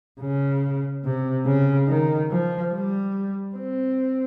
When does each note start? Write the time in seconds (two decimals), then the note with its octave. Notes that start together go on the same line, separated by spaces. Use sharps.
0.21 C#3
1.05 C3
1.46 C#3
1.88 D#3
2.31 F3
2.73 G3
3.56 C4